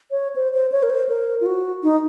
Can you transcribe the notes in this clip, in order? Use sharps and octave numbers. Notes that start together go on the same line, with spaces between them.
C#5
C5
C5
C#5
A#4
C5
A#4
F4
F#4
D#4